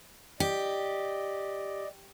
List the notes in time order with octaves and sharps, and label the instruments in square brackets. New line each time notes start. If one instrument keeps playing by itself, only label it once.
[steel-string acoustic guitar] G4 [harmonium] D5 D#5